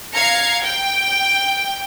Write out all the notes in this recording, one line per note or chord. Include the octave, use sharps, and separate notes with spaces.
F5 A#5 G#6 C7 C#7
G5